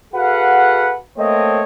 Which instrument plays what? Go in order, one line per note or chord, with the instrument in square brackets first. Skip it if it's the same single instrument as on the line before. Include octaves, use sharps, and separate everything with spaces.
[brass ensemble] F#4 G#4 A4 B4 F5 F#5
A3 A#3 C4 C#5 D#5